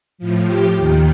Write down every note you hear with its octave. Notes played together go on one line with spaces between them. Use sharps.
A2 F3
G4
D#2 D#3